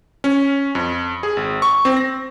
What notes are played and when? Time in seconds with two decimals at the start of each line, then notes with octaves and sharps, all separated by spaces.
0.24 C#4
0.75 F2
1.23 G#4
1.37 G#1
1.62 C#6
1.85 C4
1.97 A#6